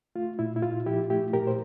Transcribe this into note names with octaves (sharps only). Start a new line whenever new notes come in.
A3 F4
A#2 E4
E4
A#2 F4
F3 E4 G4
A3 E4 G4
A#2 G4 A#4
C5